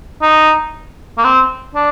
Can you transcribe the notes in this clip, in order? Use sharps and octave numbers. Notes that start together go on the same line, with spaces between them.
D#4
A#3
C4
D4